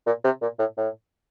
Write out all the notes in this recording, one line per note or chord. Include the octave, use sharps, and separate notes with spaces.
A#2
C3
A#2
A2
A2